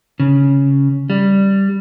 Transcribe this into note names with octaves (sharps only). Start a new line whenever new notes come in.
C#3
G3